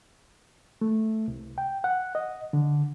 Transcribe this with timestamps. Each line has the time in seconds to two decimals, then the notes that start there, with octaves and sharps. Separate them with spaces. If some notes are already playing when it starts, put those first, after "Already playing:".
0.81 A3
1.28 C2
1.58 G5
1.84 F#5
2.15 D#5
2.53 D3